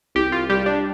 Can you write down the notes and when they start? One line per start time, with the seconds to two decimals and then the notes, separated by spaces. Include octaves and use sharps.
0.15 C2 G4
0.32 F4
0.50 G3 G4
0.66 D4